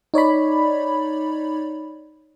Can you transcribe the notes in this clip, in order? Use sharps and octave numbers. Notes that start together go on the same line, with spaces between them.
D#4 C#5 D5 B5